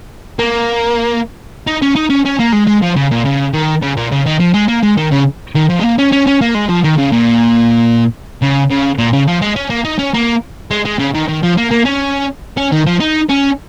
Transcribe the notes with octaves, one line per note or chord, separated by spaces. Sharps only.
A#3
D#4
C#4
D#4
C#4
C#4
A#3
G#3
G#3
F3
C#3
A#2
C#3
D#3
C#3
A#2
C#3
D#3
F3
G#3
A#3
G#3
D#3
C#3
D#3
F3
G#3
A#3
C#4
C#4
C#4
A#3
G#3
F3
D#3
C#3
A#2
C#3
C#3
A#2
C#3
F3
G#3
C#4
A#3
D#4
C#4
A#3
G#3
G#3
C#3
D#3
D#3
F3
A#3
A#3
C#4
C#4
D#3
F3
D#4
C#4